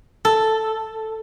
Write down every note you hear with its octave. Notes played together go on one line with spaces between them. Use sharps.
A4